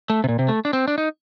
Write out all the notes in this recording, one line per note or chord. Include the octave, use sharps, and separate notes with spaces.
A3
C3
A#2
C3
A3
D4
C4
D4
D#4